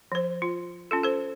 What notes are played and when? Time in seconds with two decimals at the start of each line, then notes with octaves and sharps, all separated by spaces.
0.12 F3 C5
0.42 F4
0.91 C#4 F4 A4
1.04 A4 C5